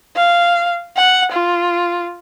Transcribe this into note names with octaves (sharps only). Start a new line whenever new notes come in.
F5
F#5
F4